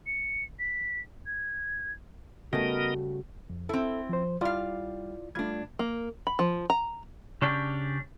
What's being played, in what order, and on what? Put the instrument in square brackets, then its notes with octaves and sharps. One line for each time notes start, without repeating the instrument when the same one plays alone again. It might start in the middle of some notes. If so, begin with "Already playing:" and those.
[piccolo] C#7
B6
G#6
[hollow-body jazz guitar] C#3 G3 A3 [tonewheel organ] B3 A#4 D#5 [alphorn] F#4
[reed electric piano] F2
[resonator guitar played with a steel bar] C4 E4 [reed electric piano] A4
[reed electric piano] F3 C5
[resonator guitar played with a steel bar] G3 F5 [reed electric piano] E4 F4 D5
[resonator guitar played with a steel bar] G3 D4 [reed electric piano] A3 F4 G#6
[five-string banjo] A#3
B5
F3
A#5
[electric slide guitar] C#3 C#4 D4 G4